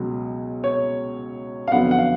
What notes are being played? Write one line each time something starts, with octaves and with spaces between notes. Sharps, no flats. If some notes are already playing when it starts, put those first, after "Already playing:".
Already playing: C#2 B2 F#3 C#4
C#5
F5
F2 D3 F#3 B3 F#5
F#5
F5